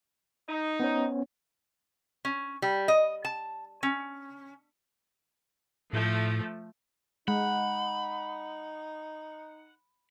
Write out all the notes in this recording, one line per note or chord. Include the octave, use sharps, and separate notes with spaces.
D#4
B3 C#4 C#5
C#4
G3
D#5
A5
C#4
A2 F3 A3
G#3 D#4 F#5 B5